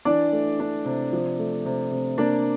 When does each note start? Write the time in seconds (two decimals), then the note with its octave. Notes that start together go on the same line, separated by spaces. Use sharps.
0.05 E3 D4 D5
0.32 A3
0.60 D4
0.85 C3
1.13 F3
1.39 A3
1.65 C3
1.91 C3
2.18 A#3 D4 D5